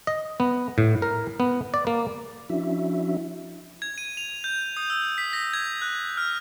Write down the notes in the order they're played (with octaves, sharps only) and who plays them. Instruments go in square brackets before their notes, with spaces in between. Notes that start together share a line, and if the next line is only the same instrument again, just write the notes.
[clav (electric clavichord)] D#5
B3
A2
A#4
B3
D5
A#3
[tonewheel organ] F3 C#4 D4 E4 F#4 E5
[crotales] G#6
D#7
F7
G6
D#6
E6
B6
A#6
G#6
F#6
F6